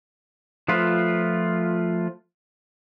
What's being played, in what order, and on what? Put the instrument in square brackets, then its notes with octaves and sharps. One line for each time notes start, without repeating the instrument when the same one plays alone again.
[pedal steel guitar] F3 A3 F4 B4